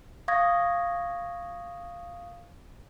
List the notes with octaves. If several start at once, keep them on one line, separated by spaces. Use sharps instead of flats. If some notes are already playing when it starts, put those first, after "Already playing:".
F5 C#6 D#6 G#6 A#6